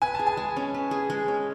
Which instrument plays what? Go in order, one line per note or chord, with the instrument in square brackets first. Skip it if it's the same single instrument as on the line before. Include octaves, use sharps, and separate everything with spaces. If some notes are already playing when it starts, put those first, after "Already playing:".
[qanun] B4 [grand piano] G#5
[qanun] G#4 [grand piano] A5
[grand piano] G#5
[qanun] G#3
C#4
B4
G#4
G#3
C#4